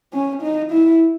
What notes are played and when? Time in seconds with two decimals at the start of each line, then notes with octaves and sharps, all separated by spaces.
0.13 C#4
0.42 D#4
0.71 E4